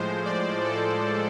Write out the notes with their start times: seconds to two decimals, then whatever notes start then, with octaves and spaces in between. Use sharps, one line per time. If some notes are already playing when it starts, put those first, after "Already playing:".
Already playing: A2 F3 G#3 C5
0.25 D5
0.64 A4